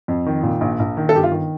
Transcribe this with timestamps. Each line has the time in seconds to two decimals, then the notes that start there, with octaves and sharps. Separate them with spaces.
0.08 F2
0.26 D#3
0.43 A#2
0.61 A#1
0.80 A#1
0.97 D#3
1.09 A4
1.14 G1 G4
1.23 F4
1.32 D#3